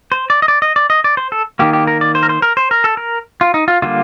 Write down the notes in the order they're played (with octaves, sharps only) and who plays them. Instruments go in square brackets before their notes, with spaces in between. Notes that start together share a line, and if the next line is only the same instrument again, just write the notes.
[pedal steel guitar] C5
D5
D#5
D5
D#5
D5
D#5
D5
C5
A4
D#3 A#3 G4
G4
A#4
D5
C5
A#4
C5
A#4
C5
A#4
A4
A#4
F4
D#4
F4
D3 G3 A#3 F4